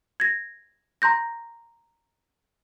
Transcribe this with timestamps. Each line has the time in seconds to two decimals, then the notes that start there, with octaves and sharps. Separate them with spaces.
0.20 G#6 A#6
1.02 A#5 C6 G6 A#6